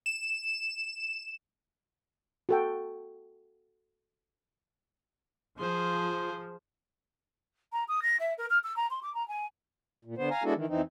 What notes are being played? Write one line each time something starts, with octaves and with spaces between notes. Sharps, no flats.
E7
F#4 A4 G5
F3 G#4 C5
A#5
D#6
A#6
E5
A#4
F6
E6
A#5
C6
D6
A#5
G#5
A#2
D3 B3 C5
F5 G#5 A#5
G#3 B3 D4 E4 F#4 A4
D#3 E3
F2 E3 C4 D#4